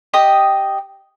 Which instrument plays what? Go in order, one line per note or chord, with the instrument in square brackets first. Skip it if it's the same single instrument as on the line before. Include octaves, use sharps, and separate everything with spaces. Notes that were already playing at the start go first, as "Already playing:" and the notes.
[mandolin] G4 D#5 D#6